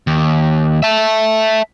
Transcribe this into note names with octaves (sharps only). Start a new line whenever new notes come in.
D#2
E5 A5